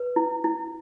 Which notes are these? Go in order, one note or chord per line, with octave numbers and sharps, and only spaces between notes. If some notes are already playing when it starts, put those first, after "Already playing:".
Already playing: B4
E4
E4